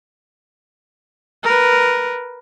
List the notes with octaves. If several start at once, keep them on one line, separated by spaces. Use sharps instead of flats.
A#4 B4